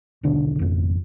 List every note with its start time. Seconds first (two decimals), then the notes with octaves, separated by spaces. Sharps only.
0.23 D#1 B1 D3 D4
0.59 G#1 F2